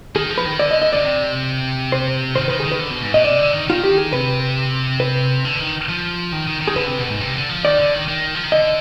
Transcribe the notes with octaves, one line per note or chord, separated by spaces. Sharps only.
D#3 G#4
F3
B4
D#3
D3 D5
D#5
D#5
B2 D5
C3
C5
D#3 C5
D#3 B4
G#4
D#3
B4
D3
B2
G#2
B2 D#5
C3 D5
D3
D#3
D#3 F4
G4
G#4
C3 B4
B4
D3
D#3
F3
D#3
D#3
D#3
G#4
D3 B4
C3
B2
G#2
C3
D3
F3
D#3 D5
D3
D#3
D#3
F3
D#3
D3 D#5